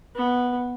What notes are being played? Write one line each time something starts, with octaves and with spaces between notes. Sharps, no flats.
B3